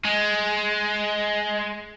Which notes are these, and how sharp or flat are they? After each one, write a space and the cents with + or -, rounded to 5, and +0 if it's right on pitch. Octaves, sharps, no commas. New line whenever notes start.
G#3 +10